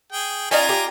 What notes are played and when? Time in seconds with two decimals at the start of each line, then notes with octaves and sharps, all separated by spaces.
0.12 G#4 G5
0.51 C#4 D#4 F4 D5 G#5 A#5
0.69 G4